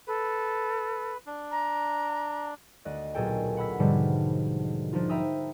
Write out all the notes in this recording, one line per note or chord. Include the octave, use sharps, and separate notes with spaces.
A4 B4
D4
A#5
D2 D5 D#5 F#6
B1 A#2 G#4 A4 G5
F#5 B5 E6 B6
G#2 B2 D3 F3 G3
F3 D4 D#4 F4
E5 G5 A#5 B5 D#6